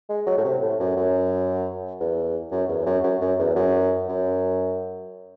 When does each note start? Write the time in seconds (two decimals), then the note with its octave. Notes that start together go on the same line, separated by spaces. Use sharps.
0.09 G#3
0.27 F#3
0.37 A2
0.44 C3
0.62 A2
0.80 F#2
0.96 F#2
2.00 E2
2.51 F#2
2.69 E2
2.86 F#2
3.04 F#2
3.22 F#2
3.39 E2
3.56 F#2
4.08 F#2